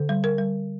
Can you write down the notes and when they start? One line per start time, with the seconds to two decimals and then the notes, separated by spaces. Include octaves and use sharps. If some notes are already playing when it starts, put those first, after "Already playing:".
Already playing: D3 A4
0.09 G3
0.24 A#4
0.39 G3